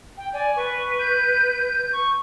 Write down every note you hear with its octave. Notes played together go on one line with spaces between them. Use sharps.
G5
D5 G#5
B4 C#6
G6
C#6